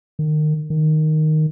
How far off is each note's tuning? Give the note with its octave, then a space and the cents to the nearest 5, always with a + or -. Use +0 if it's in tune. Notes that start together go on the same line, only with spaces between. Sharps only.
D#3 -30
D#3 -5